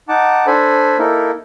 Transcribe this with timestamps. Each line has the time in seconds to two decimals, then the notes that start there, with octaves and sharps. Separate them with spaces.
0.09 D#4 F#5 A5 D6
0.47 D4 A4 C5 G#5 B5
0.98 A#3 D#4 E4 A4 A#4